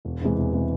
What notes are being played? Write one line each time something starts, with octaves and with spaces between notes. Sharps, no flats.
E1
E2 C3 E3 G#3
E1
C3 E3 G#3